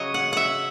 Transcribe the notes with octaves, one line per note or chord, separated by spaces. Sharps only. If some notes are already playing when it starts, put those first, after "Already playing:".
Already playing: C#3 F#3 C#4 C#5 D#5
F#5
E5 F#5